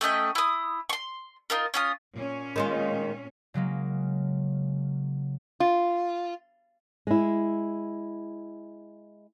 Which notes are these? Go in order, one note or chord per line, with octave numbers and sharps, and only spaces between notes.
A3 C#4 D#5 G5
E4 D#6
C6 C#6
D#4 F4 A#4
C#4 F4 D#6
A#2 C#4
D#3 G#3 F4
C#3 F#3 G#3 A#3
F4
G#3 E4